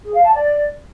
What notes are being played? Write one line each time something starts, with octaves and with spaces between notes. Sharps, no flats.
G#4
F5
A5
D5